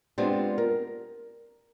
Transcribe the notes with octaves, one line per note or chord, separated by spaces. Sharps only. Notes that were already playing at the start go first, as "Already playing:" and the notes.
G#3 B3 C4 D4 F4 G4
A#4